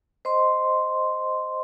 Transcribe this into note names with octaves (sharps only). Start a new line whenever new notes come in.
C5 D#5 C6